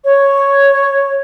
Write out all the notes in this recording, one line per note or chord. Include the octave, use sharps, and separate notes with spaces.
C#5